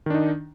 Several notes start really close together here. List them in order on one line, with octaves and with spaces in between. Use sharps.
D#3 D4 D#4